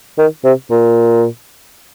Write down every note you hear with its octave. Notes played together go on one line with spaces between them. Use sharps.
D#3
C3
A#2